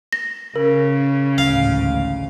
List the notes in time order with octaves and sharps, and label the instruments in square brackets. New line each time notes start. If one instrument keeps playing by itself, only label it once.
[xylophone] A#6
[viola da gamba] C#3 [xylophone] A#4
[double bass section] A1 D2 G#2 [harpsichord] F5